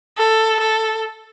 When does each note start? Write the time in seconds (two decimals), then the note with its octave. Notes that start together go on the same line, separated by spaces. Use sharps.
0.18 A4
0.60 A4